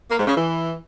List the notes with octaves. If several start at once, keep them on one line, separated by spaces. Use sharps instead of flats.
A#3
G#2
C#3
E3